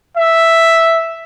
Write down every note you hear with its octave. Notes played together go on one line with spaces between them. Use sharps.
E5